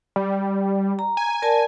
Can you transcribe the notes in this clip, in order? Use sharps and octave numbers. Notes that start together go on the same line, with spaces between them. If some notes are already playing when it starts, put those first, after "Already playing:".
G3
A#5
G#5
A#4 D5 A5